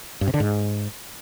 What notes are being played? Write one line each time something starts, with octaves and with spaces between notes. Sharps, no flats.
G2
C3
D3
G#2